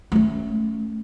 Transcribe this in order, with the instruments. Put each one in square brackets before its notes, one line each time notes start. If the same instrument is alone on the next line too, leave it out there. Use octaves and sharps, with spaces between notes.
[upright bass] A3 C#4